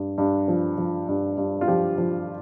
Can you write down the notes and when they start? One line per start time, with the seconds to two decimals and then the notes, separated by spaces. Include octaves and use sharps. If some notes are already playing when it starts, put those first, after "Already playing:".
Already playing: G2
0.18 G2
0.48 F3
0.78 F3
1.08 G2
1.37 G2
1.61 F4
1.68 F3 G4
1.98 F3